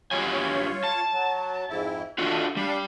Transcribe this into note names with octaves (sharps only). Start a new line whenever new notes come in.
F#2 G3 F4 C#5 G#5
A5
F#3
F2 G#2 E4
D4 F4 F#4 A4
G3 D4 F5